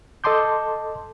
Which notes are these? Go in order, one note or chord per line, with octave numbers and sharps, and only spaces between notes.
A4 D#5 A5 C6 D6 G6